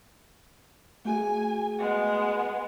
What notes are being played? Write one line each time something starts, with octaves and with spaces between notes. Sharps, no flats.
A3 F#4 G#4 G#5
G#3 B3